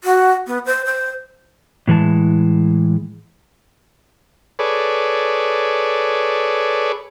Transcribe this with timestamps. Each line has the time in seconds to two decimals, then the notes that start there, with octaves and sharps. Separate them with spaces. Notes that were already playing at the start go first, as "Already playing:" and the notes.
0.04 F#4
0.47 B3
0.66 C5
0.85 C5
1.87 A2 E3 G#3 A5
4.59 G#4 A4 B4 C#5 D5